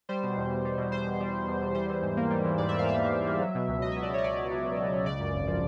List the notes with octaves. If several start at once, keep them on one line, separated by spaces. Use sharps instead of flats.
G3 C5
B2
E2
E2
G3
B2
E2 C5
E2
G3
B2
E2
E2
G3 C5
E3
G#2
A#3
G3
E3
G#2 D5
A#3 E5
F5
G3 E5
E3
G#2
A#3
F#3
B2
C#2
C#2 D#5
E5
F#3
D5
B2 C#5
D#5
C#2 D5
C#2
F#3
B2
C#2
C#2
C#3 D5
F#2
G#1
F3